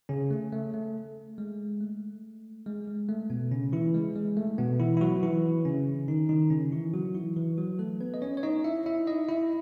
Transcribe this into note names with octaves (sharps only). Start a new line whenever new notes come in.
C#3 C#4
A3
A3
A3
G#3
A3
G#3
G#3
A3
B2 B3
C#3 C#4
E3 E4
G#3
G#3
A3
B2 B3
E3 E4
E4
F#3 F#4
E3 E4
C#3 C#4
D#3 D#4
D#3 D#4
C#3 C#4
E3 E4
F#3 F#4
E3 E4
E3 E4
F#3 F#4
A3 A4
B3 B4
D#5
C#4 C#5
C#5
D#4 D#5
E4 E5
E4 E5
D#4 D#5
E4 E5